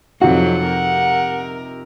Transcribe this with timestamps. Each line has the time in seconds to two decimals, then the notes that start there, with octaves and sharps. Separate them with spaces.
0.22 F2 C3 F#3 D#4 F4 F#4 F#5
0.66 A#4